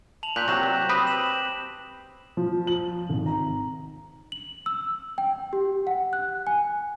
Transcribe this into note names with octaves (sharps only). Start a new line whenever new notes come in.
A5 F7 F#7
A#2 F#6 G6 B6
C3 F#3 G5 C#6 A#6 E7
C4 G4 B4 B5 D#6
E7 F#7
F3
F#7
G#1
A#5
F#7
E6
G5
G4
F#5
F#6
G#5